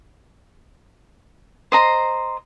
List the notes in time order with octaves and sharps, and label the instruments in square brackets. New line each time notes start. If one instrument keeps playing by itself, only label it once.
[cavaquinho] C5 D#5 A#5 C6